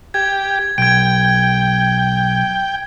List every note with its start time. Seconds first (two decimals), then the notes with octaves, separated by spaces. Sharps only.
0.14 G4 G#6
0.78 B1 G5 G#6 D7